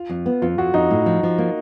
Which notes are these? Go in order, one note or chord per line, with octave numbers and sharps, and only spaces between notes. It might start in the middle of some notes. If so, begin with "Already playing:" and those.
Already playing: F4
F2
B3
F2 F4
F2 F#4
F2 D#4
A2
F3
F3
A#3